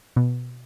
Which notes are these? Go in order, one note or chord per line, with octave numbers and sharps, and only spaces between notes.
B2